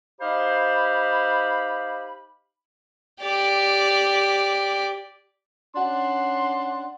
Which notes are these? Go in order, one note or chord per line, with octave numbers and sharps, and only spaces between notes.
D#4 G4 C5 F5 B5
G4 D5
C#4 D4 F#5 C6